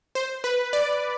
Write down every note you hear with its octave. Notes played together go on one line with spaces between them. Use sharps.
C5
B4
D5